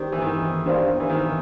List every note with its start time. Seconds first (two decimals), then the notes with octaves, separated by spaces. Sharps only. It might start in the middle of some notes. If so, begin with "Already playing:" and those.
Already playing: D#3 D4 G4 C5
0.12 E3
0.22 D#3
0.66 D#3 D4 G4 C5 F5
1.00 E3
1.10 D#3